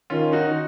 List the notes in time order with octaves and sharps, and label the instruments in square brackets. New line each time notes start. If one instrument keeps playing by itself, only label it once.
[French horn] D#3 [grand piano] C#4 F4
[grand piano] D#4 F#4